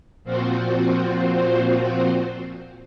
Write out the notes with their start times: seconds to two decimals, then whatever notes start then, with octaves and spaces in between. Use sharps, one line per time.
0.24 A#2 F3 C4 F4 F#4 C5